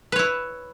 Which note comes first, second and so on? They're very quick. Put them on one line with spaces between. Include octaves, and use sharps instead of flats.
B4 C#5 E4